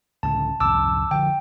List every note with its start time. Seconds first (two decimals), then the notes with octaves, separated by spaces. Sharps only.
0.23 C#2 A2 D3 A5
0.60 C2 F2 G#2 A5 D6 E6
1.11 D3 F3 G5